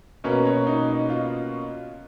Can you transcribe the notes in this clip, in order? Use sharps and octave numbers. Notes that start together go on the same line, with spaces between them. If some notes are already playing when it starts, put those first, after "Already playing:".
B2 A#3 C#4 B4
C#5
D#4
F4